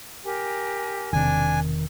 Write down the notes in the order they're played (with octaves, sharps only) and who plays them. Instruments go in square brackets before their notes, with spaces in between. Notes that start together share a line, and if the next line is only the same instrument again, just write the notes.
[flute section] G4 A#4 G#5
[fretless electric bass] E1 C3 [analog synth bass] D#3 [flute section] D4 [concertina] G#5